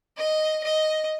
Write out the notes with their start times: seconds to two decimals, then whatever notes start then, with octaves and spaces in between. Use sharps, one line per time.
0.18 D#5
0.64 D#5